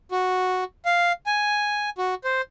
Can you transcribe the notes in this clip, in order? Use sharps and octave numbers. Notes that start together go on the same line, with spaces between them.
F#4
F5
G#5
F#4
C5